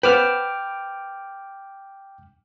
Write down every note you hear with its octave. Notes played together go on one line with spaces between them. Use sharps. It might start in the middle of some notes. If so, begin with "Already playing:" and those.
B4 C5 F#5 G5 D6 F6